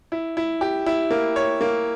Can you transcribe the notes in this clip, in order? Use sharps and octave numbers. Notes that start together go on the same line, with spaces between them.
E4
E4
G4
E4
A#3
C#5
A#3